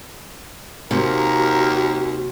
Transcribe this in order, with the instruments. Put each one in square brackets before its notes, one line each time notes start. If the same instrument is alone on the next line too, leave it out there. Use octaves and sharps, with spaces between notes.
[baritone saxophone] D#2 [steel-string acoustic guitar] C3 [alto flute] F#4 [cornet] A#4